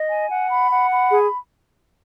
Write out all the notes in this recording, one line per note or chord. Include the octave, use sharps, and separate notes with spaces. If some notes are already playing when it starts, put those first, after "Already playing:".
Already playing: D#5
G#5
F#5
B5
F#5
B5
G#4